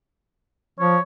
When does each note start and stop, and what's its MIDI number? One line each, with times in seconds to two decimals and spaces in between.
0.80 0.97 53
0.80 1.01 73